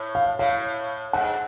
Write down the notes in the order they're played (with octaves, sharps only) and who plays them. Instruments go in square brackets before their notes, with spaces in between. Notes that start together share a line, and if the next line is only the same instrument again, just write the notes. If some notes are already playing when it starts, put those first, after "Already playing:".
Already playing: [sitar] A2
[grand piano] F5
[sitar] A2 [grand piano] F5
[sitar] G#2 [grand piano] F#5